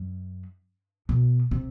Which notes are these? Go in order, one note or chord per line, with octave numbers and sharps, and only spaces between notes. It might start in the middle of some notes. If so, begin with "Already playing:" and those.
Already playing: F#2
B2
C3